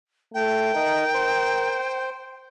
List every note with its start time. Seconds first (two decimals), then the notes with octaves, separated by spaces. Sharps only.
0.34 A3 G5
0.75 D#4 A#4
1.14 C5